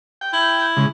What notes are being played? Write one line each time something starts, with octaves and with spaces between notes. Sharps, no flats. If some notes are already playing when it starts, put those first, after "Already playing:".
G5
E4
C#3 G#3